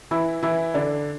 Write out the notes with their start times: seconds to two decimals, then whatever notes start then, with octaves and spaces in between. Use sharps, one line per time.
0.11 E3 E4
0.43 E3 E4
0.74 D3 D4